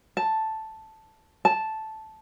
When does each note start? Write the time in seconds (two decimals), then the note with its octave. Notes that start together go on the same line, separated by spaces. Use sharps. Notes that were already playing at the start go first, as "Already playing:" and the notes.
0.17 A5
1.45 A5